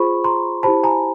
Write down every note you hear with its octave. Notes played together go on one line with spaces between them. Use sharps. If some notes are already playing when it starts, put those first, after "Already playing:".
Already playing: F4 G#4 C5 B5 C#6
A#5 C6
E4 G4 C5 A5 B5
G#5 A#5